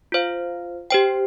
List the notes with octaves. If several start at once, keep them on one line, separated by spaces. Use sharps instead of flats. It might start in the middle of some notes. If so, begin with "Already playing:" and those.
F4 C5 F5
G4 C5 G5